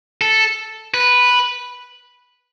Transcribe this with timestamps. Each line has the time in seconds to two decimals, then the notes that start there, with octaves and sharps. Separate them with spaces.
0.21 A4
0.94 B4